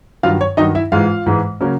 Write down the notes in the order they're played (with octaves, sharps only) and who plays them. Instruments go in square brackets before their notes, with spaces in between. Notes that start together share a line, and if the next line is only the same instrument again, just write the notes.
[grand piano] G2 D#3 F#3 F4 F5
C#5
G2 D#3 F#3 D#4 D#5
E4 E5
G#2 E3 G#3 F4 F5
G#2 E3 G#3
C#3 F#3 A#3 C#4